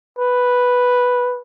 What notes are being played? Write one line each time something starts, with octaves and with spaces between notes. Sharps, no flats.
B4